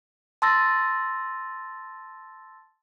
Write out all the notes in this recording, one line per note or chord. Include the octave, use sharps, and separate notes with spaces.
A5 C6 E6 A6 A#6